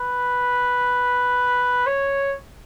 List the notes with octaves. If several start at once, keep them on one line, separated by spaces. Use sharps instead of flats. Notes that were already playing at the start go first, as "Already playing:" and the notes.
Already playing: B4
C#5